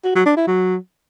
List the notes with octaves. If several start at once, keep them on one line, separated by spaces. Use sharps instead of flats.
F#4
F#3
D4
E4
F#3